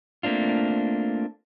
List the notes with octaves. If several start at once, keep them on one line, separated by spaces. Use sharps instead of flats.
A3 A#3 C4 D4 F4